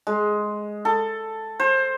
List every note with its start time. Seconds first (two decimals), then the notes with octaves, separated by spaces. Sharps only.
0.07 G#3
0.85 A4
1.60 C5